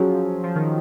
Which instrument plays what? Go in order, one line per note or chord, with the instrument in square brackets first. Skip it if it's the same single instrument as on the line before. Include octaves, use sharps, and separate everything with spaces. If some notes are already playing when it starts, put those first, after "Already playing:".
Already playing: [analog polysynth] F3 [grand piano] F#3 C#4 G#4
[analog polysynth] F3
D#3